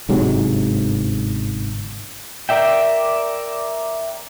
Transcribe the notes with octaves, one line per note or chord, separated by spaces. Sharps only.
G1 G#2 C3 F#3
A#4 D5 E5 G5